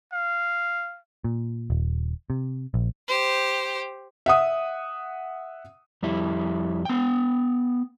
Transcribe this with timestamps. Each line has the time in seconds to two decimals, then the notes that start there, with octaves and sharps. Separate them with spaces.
0.13 F5
1.24 A#2
1.70 D#1
2.30 C3
2.74 A#1
3.08 G4 C5
4.26 E5 F#5 D#6
6.03 F2 G3 E4
6.85 B3 G5